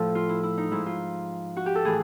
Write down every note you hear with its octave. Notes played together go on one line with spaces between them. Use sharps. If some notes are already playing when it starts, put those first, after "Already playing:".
Already playing: A2 F3 A4
F4
E4
E4
D#4
G#2 F3 E4
F4
F#4
G4
A4
A2 E3 G#4